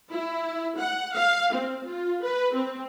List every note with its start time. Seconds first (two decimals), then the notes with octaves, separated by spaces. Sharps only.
0.11 E4
0.78 F#5
1.15 F5
1.54 C4
1.86 F4
2.24 B4
2.53 C4